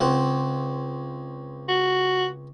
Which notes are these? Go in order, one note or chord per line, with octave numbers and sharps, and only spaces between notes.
C#2 C4 F#5
F#4